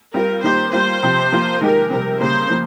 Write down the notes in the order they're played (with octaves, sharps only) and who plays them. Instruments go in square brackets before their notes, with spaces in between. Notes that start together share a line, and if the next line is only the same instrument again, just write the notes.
[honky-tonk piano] G3 C4 F4 [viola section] A#4
[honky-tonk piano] D#3 G3 A#3 D#4 G4 [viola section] C5
[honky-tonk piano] G3 A#3 F4 [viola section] C5
[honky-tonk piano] C3 F3 C4 G4
F3 A#3 F4
[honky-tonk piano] D#3 G#3 D#4 G4 [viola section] A#4
[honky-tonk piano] C3 G3 C4 [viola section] A#4
[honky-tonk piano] C#3 G3 A#3 [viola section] C5
[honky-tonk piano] F3 A#3